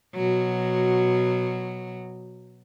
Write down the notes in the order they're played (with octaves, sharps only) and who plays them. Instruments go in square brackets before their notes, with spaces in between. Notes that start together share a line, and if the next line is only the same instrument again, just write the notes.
[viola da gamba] B2 F#3